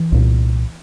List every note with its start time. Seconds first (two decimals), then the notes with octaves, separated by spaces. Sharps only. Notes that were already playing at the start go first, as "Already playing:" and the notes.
Already playing: E3
0.12 C2 A#2